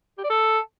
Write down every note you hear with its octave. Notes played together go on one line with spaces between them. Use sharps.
G4
D5
A4